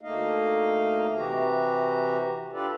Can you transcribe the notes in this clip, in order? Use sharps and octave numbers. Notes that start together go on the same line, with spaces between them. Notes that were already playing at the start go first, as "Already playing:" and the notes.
D2 A3 A#3 D#4 D#5 F5
C3 E3 F#4 G4 A#5
D4 F4 G4 A4 B4 D5